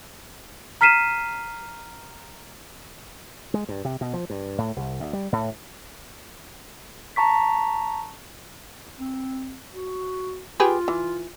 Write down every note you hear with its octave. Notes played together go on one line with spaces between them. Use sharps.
A#5 F6 B6 C7 D#7 E7
G#3
G2
C3
B2
F3
G2
A2
C2
D2
G3
A2
A5 A#5 C#6 B6
C4
F#4
F4 G4 G#4 B4
E3